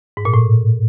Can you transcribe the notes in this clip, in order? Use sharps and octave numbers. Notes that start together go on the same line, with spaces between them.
G#2
A#2
A2